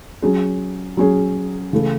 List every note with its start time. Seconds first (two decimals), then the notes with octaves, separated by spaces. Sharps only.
0.22 F#3 C#4 G#4
0.97 F#3 C#4 G#4
1.73 C#3 E3 A3 E4 A4